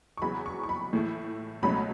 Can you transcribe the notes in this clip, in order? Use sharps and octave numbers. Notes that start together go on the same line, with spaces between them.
C#6
E2 C#3 F#3 B5
C#6
C#6
B5
A2 E3 A3 E4
C#2 B2 F#3 A3 C#4 B5